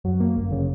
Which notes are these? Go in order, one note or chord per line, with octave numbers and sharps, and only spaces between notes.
F#2 F#3
A#3
G1
C#3